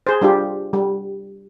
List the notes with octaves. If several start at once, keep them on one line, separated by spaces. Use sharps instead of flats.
G#4 C5
G3 D4 F4 G4
G3